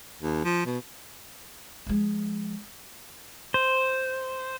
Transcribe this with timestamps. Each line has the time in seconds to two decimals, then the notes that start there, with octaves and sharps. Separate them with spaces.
0.21 D#2
0.45 F3
0.66 B2
1.87 F3 G#3
3.54 C5